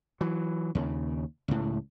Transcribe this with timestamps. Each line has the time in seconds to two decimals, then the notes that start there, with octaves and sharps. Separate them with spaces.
0.21 E3 F#3
0.75 D#2 C#3
1.48 C#2 A2